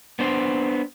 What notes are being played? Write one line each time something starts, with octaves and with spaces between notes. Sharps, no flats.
B3 D4 C5